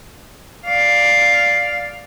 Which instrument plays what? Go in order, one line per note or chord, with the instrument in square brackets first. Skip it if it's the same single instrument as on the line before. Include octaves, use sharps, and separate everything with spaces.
[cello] D5 F5